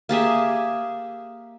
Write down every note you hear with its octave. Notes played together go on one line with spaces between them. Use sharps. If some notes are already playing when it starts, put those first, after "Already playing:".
A#3 G4 G#4 E5